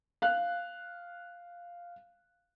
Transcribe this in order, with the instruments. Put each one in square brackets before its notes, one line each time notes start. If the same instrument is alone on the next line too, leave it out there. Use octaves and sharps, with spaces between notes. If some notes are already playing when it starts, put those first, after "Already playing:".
[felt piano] F5 F#6